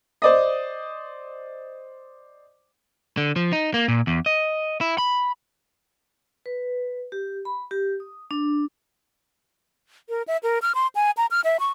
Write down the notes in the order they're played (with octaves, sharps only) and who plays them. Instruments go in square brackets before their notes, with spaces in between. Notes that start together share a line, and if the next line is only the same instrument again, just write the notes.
[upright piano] C5 D5 D#5
[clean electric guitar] D3
F3
D#4
A#3
A#2
E2
D#5
E4
B5
[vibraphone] B4
G4
B5
G4
D#6
D4
[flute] A#4
E5
A#4
F6
C6
G#5
A#5
F6
E5
C#6